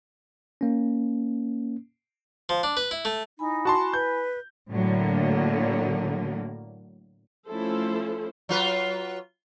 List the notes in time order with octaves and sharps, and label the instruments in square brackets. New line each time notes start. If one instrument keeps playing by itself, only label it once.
[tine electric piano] A#3 C#4
[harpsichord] F3
D4
B4
E4
A3
[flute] D#4 [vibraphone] E4 G#5 B5
[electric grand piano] F#4 A5 C6
[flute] B4 [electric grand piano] G6
[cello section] A2 D3 F#3 A#3
[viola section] F3 A3 C#4 E4 A4 C5
[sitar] F#3 F4 B4